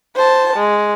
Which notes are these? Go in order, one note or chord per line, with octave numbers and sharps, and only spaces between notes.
C5 A5
G#3